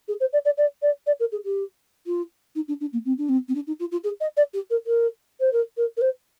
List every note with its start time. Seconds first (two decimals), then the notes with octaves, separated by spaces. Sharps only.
0.08 G#4
0.20 C5
0.32 D5
0.45 D5
0.57 D5
0.82 D5
1.06 D5
1.19 A#4
1.32 G#4
1.44 G4
2.06 F4
2.55 D#4
2.68 D4
2.80 D4
2.93 A#3
3.05 C4
3.18 D4
3.29 C4
3.48 C4
3.54 D4
3.67 D#4
3.79 F4
3.91 F4
4.03 G#4
4.20 D#5
4.36 D5
4.53 G4
4.70 A#4
4.86 A#4
5.40 C5
5.52 A#4
5.77 A#4
5.96 A#4
6.01 C5